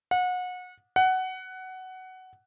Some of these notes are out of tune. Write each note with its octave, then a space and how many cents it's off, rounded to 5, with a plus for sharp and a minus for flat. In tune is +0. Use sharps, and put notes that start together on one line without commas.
F#5 -30
F#5 +15